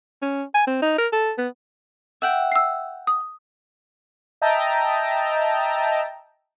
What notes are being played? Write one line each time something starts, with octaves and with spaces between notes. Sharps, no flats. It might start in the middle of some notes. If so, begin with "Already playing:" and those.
C#4
G#5
C4
D#4
A#4
A4
B3
E5 F#5 G5
E6 C7
D#6
D#5 E5 G5 A5 A#5